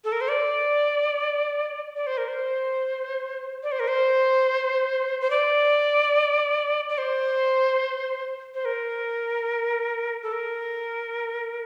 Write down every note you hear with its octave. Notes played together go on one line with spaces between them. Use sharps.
A4
A#4
C5
D5
D5
C5
A#4
C5
D5
C5
A#4
C5
C5
D5
D5
C5
C5
A#4
A4
A#4